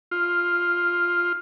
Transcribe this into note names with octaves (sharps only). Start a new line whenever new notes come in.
F4